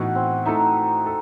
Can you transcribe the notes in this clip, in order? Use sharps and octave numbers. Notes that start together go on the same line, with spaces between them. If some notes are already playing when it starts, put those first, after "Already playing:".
Already playing: A2 E3 B3 D#4 F#4
C4
A3 D#4 E4 A4 E5
A4